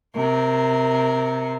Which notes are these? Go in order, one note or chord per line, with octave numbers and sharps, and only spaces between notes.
C3 A#4